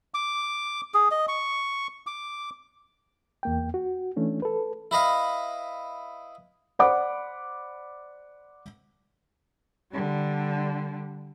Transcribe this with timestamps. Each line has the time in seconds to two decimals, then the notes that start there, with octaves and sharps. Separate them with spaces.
0.14 D6
0.94 G#4
1.11 D#5
1.28 C#6
2.07 D6
3.43 E2 A#3 G5
3.74 F#4
4.16 E3 A3 C#4 D4
4.42 A4 B4
4.91 E4 B4 D#5 F5
6.79 C5 D5 F#5 B5 D6
9.91 D3 G3